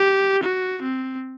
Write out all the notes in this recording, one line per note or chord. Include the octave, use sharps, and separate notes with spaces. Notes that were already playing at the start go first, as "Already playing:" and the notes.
Already playing: G4
F#4
C4